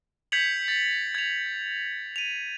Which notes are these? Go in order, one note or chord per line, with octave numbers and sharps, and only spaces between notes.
G6 G#6 B6 C#7 F7 F#7
A6
G#6 F7
D#7 F7